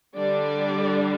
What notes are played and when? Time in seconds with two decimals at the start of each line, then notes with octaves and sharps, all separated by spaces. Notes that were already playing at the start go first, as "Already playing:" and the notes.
0.17 D3 G3 D4 D5